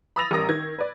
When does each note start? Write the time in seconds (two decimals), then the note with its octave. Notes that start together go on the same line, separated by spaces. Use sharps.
0.16 B5 D#6 E6 A6 A#6 F7
0.31 A1 G3 A#4 A#5 D#6 A#6
0.49 D#3 G#6 A#6
0.78 B4 D5